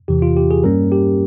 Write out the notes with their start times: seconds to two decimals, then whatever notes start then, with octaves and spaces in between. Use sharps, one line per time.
0.08 E2 C3 E3 G4
0.22 F4
0.36 G4
0.51 G#4
0.64 G2 G3 A#3 C#4 A#4
0.92 G4